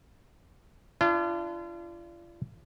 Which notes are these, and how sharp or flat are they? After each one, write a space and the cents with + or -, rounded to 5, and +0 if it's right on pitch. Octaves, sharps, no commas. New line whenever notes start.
D4 +0 F4 -40